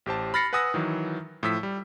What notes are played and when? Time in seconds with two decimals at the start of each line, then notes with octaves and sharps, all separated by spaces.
0.06 A1 G4 C5 A5
0.34 B5 F6 A6 A#6 C7 C#7
0.53 B4 F#5 G#5 D#6 E6 A#6
0.74 D#3 E3 F#3
1.43 A2 F3 E6 B6
1.63 G3